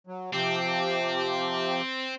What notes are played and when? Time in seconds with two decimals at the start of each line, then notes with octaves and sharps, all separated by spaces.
0.07 F#3
0.33 C3 F3 C4 G4